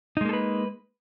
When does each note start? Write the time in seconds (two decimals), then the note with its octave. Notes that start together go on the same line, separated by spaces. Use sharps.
0.17 D#4
0.21 G#3
0.25 A#3
0.29 A4
0.33 B4